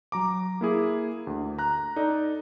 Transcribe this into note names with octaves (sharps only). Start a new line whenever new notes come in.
F#3 A#5 D6
A#3 E4 G#4
D2
A#5 F#6
D#4 A4 D5